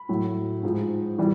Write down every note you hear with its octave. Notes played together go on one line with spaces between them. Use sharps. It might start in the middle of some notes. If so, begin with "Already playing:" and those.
Already playing: B5
A2 F#3
G#2 F3
E3 G3